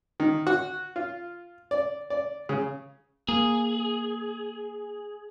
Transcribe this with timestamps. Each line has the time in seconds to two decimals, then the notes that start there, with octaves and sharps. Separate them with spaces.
0.20 D#3
0.47 F#4
0.96 F4
1.71 D5
2.10 D5
2.49 C#3
3.29 A#3 G#4